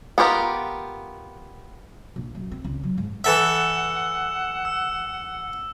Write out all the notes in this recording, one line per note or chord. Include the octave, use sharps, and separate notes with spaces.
B3 F4 G4 A#4
A#1
F#2
C4
C#2
F#3
G#2
E3 A4 E5 F#5 E6 E7
E6